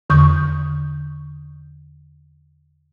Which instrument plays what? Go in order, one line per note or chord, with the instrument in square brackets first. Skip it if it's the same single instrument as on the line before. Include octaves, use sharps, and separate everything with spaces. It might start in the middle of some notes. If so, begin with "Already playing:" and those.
[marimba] E2 D3 C#6 D#6 G6